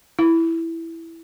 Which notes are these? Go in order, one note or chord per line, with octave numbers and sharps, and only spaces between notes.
E4